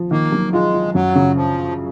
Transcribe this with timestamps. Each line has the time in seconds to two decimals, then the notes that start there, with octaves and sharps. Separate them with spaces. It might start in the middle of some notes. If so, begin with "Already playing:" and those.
Already playing: F3
0.11 D#3 A#3
0.32 F#3
0.53 G#3 F4
0.74 F4
0.94 F#2 F#3
1.15 C#3
1.36 F3